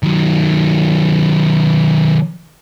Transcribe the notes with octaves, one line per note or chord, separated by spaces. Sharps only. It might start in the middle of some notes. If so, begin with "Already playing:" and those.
D#3 F#3